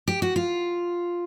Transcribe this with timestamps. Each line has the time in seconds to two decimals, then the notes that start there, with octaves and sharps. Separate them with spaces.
0.08 G4
0.22 F#4
0.36 F4